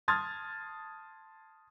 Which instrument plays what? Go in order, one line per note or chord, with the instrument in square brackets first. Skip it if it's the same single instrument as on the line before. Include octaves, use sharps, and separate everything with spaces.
[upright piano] A5 C6 D#6 F6 G#6 A6